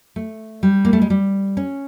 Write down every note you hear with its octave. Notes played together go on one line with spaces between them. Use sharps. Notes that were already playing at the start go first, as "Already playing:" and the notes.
A3
G3
A#3
A3
G#3
G3
C#4